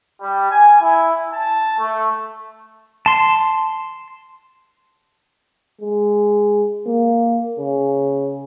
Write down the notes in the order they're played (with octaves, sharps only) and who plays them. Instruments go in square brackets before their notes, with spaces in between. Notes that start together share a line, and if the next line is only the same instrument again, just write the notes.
[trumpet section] G3
G#5
E4
A5
A3
[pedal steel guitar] A5 C6
[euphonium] G#3
A#3
C#3